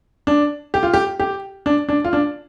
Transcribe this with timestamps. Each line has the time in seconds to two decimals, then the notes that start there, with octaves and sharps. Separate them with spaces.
0.27 D4
0.74 G4
0.83 F4
0.93 G4
1.20 G4
1.66 D4
1.89 D4
2.04 F4
2.13 D4